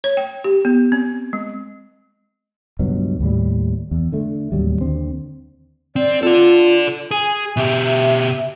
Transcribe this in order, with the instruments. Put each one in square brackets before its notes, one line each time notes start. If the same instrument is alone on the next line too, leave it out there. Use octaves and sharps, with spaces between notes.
[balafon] C#5
G5
G4
B3
C4
G#3
[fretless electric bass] C#2 G2 B2 F#3
D#2 A2 G3
E2
D3 A3
D1 D#2 F#3 G3
D#2 D3 C4
[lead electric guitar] C4 [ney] D5
[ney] F4 [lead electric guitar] A4 D5
[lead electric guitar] G#4 [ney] G#5
[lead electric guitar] B2 G4 [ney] E5